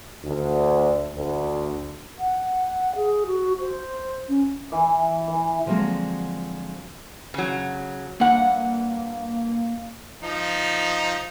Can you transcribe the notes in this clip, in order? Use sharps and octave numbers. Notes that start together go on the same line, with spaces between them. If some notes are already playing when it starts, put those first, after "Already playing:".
D2
D2
F#5
G#4
F#4
C5
C#4
E3
E3
D3 F3 F#3 G#3 A#3 C4
C#3 F#3
G2 A#3 F#5
F3 D#4